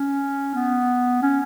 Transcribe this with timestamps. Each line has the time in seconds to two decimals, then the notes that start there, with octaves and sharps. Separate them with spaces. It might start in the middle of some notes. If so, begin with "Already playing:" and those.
Already playing: C#4
0.55 B3
1.22 C#4